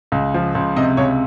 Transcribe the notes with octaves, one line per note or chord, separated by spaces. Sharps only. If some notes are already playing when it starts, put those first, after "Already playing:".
C#2
F3
C#2
C3 D#5
C#2 C#5